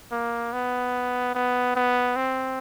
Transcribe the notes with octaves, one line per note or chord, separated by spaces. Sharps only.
A#3
B3
B3
B3
C4